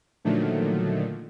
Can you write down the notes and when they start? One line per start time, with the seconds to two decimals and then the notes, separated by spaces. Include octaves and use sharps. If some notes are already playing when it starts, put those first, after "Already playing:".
0.25 A#2 D3 D#3 F3 F#3 A3